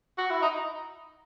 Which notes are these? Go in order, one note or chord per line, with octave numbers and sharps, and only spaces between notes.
F#4
E4
D#4